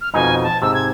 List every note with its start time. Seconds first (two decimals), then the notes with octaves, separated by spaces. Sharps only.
0.01 F6
0.14 F2 B2 D#4 G#5
0.43 A5
0.62 G#2 C3 E6
0.74 G#6